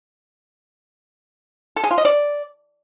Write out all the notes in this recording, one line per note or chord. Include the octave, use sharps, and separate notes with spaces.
A4
G#4
F4
D#5
D5